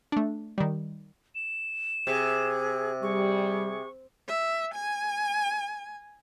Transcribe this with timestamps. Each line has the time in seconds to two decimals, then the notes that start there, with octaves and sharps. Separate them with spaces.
0.12 A3 D4
0.58 D#3 G3
1.35 E7
2.07 C3 G#4
3.02 G3 G#4 C#6
4.28 E5
4.74 G#5